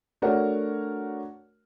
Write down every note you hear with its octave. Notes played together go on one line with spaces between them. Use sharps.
A3 D4 F#4 A#4 C#5 F#5